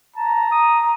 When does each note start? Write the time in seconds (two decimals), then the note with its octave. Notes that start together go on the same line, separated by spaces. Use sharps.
0.16 A5 A#5
0.52 D#6